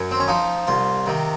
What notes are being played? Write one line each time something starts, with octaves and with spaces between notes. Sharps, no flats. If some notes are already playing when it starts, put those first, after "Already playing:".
Already playing: F#2
C4
C#4
F3 D#4
C2 F4
C3 D#3